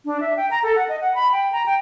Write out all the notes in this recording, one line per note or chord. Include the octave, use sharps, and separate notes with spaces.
D4
E5
G5
A#5
A4
F#5
D#5
F#5
B5
G5
A#5
G5